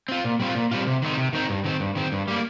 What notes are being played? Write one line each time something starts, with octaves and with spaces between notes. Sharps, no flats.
C4 F4
A#2
G3 C4 F4
A#2
G3 C4 F4
C3
D#3 C4 D#4
C3
D#3 C4 D#4
G2
D#3 C4
G2
D#3 C4
G2
G3 A#3